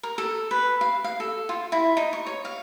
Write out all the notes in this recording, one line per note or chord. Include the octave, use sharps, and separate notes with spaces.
A#4
A4
B4
F5
F5
A4
F4
E4
D#4
C#6
C#5
F5